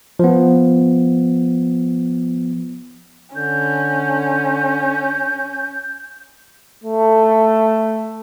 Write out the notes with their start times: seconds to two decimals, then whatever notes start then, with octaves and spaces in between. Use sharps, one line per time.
0.19 F3 B3
3.36 D3 C#4 G6
6.84 A3